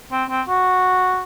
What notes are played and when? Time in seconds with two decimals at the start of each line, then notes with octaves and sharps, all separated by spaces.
0.12 C4
0.29 C4
0.48 F#4